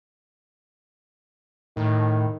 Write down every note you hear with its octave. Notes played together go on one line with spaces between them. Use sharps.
A2 D#3